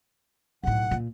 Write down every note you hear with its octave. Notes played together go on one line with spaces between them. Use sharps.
B1 A2 F#5
A#2